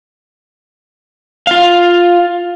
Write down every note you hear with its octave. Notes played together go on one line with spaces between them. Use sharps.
F4 F5